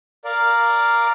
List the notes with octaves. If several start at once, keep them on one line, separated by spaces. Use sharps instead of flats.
A#4 D5 F5